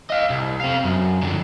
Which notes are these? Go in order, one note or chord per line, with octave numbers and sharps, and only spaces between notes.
D#5 F5
C2
C4 F5
F#2
F2 D3